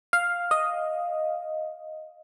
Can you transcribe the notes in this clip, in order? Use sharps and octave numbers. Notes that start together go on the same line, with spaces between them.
F5
D#5